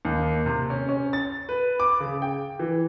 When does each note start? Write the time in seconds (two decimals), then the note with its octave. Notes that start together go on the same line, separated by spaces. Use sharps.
0.05 D#2
0.46 C3
0.70 C#4
0.89 C#4
1.13 A6
1.49 B4
1.80 D6
2.00 C#3
2.22 G5
2.59 E3